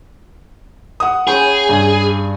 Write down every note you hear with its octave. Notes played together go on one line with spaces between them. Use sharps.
F#5 D#6
C#4 G#4 G5 B5
G2